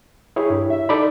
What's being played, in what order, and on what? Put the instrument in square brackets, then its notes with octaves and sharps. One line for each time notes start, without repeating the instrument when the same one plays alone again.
[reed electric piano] E4 G4 C#5 [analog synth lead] G#4
[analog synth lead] G2
E5
[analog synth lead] D#4 [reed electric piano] A4 D5 B5